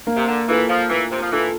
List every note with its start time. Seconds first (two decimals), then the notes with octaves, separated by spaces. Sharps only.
0.07 A#3
0.17 C3
0.28 D3
0.48 E3 F4 A4
0.69 F3
0.90 E3 A#3
1.11 C3
1.22 F3
1.32 E3 F4 A4